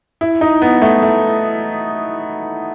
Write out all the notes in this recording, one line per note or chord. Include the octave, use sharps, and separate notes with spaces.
E4
D#4
B3
A3
A3